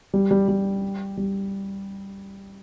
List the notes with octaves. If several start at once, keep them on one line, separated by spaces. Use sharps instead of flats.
G3
G3
G3
G3